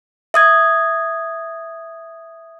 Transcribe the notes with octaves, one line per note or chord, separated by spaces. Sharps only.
E5 D#6 G#6